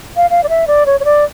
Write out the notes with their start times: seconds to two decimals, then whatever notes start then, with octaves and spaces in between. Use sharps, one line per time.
0.17 F5
0.30 F5
0.44 D5
0.49 E5
0.67 D5
0.86 C#5
1.00 C#5
1.05 D5